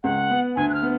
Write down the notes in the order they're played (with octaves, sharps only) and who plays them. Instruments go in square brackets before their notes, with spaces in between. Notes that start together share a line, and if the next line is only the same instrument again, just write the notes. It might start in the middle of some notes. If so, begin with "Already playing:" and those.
[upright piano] C#2 [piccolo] F#5
[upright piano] B3
[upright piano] D2 [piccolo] G#5
[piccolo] F#6
F6
[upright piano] B3